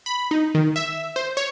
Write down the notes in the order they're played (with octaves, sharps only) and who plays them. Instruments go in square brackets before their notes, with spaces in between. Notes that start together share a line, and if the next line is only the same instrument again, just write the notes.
[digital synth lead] B5
D#4
D#3
E5
C5
C#5